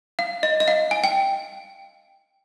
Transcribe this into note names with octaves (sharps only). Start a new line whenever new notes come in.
F5
D#5
D#5
F5
G#5
G5